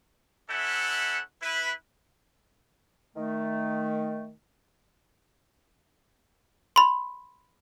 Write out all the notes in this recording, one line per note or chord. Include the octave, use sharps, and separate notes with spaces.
C#4 E4 A4 E5 F#5
E4 B4
D#3 A3
B5 C6